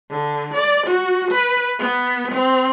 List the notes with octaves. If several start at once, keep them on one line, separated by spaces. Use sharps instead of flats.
D3
D5
F#4
B4
B3
C4